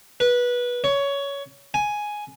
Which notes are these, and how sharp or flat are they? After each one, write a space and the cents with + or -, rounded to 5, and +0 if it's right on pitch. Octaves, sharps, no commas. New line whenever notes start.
B4 -20
C#5 +15
G#5 +5